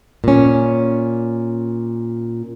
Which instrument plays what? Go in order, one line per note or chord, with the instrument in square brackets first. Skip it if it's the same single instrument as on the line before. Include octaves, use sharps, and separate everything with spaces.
[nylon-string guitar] A#2 C#4